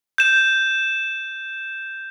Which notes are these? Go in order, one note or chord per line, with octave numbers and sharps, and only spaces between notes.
G6 E7